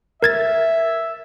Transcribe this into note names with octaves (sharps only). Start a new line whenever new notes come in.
A#4 E5 G#6 A6